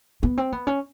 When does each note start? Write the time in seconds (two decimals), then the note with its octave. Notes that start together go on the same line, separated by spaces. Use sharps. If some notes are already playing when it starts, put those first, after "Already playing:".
0.23 B3
0.38 C4
0.52 B3
0.67 C#4